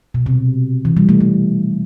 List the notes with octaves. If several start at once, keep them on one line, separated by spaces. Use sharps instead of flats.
B2
C3
E3
G3
A3
A3